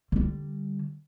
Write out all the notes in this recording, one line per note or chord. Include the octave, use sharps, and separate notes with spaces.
D3 G3